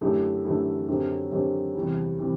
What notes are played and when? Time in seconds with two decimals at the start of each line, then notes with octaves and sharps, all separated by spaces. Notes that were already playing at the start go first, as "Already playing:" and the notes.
0.01 F#2 D3 A3 E4 G4
0.45 F#2 D3 A3 E4 G4
0.88 F#2 D3 F#3 C4 G4
1.31 F#2 D3 F#3 C4 G4
1.75 E2 C3 E3 G3
2.19 C3 E3 G3